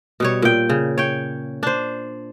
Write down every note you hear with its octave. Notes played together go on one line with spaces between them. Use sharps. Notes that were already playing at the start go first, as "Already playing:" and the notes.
B2 G3 C#5
A#2 G5
C#3
C#5 G5
D4 C5